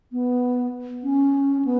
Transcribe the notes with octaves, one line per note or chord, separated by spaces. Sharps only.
B3
C#4
B3